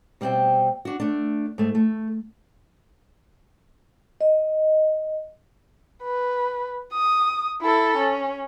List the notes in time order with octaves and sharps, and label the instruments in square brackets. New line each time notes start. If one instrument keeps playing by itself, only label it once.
[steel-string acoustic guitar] B2 G3 B3 C4 E5 G5
D4 F#4
A3 D4
G#2 A3
A3
[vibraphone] D#5
[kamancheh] B4
D#6
E4 A4
C#4